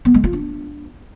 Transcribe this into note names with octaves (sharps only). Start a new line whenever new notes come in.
B3
G#3
F4
D4